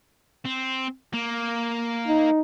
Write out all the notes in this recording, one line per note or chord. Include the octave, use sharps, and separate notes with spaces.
C4
A#3
D#4